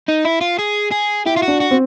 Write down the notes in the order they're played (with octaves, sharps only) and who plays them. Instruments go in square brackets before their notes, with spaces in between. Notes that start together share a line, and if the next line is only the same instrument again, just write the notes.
[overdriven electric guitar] D#4
E4
F4
G#4
G#4
[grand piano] E4 [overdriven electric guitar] G4
[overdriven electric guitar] F4
F#4
[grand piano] D4
[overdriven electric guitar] F#4
[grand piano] C4